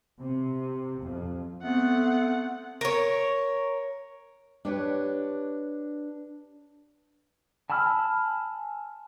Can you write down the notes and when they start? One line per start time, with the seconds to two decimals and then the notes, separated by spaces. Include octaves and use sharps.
0.19 C3
1.02 F2
1.63 A3 B3 C4 F#5
2.81 A#4 C#5
4.65 D4 G4 B4 C#5
7.70 G#5 A5 B5 E6 F6